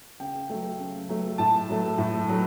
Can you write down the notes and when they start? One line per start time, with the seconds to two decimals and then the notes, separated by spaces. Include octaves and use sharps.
0.20 C#3 G5
0.50 F#3 A3
0.79 C#3
1.09 F#3 A3
1.38 A2 A5
1.69 F#3 A3
1.98 A2
2.28 F#3 A3